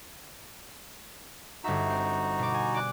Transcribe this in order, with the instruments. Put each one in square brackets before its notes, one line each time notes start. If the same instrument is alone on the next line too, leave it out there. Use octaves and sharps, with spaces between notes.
[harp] G1 E5 [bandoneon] D#4 F#4
[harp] C4
B2 D6
G#5
D5 D6 F#6